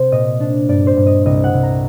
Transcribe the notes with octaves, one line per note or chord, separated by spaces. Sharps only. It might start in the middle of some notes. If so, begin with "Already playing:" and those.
Already playing: C3 C4 C5
A#2 D#5
D4
G2 D5
C5
G2
D#5
C2 D#5
F#5
C2
A#5